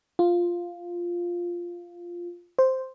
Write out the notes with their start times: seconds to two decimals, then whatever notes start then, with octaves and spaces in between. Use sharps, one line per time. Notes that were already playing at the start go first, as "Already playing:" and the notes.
0.19 F4
2.59 C5